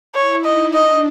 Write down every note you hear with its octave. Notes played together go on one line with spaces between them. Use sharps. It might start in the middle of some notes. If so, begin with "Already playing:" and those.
E4 C#5
D#4 D#5
D4 D#5